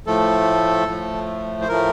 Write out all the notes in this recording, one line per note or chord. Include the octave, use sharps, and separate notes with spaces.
A2 F3 A3 A4
A2 F3 A3
C5
A2 F3 A3 A#4